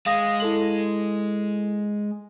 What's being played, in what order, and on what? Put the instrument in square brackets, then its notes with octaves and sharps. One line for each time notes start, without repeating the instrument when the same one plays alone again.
[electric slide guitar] G#3 [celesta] F5 D#6 A#6
[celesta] E4 A4 F#7